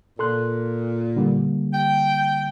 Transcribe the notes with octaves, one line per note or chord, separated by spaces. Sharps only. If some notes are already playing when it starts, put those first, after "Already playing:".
A#2 A4 C6 F#6
D3 G3 A#3
G5